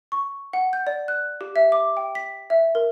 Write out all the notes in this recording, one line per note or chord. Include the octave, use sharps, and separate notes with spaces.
C#6
F#5
G6
D5
F#6
G4
E5
D6
G5
B6
E5
A#4